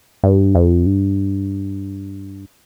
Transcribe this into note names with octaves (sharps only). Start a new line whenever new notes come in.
G2
F2
G2